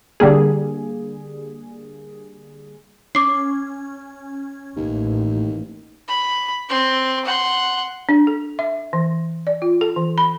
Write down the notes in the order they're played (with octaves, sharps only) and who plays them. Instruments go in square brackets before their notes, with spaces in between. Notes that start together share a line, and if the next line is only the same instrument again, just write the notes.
[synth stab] D3 G3 A#3 G#4
[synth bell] C#4 [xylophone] D6 C7
[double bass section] A1 [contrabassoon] D#2
[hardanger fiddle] B5
C4 C6
F#5 C6
[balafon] D4
A4
E5
E3
D5
F4
A4
E3
B5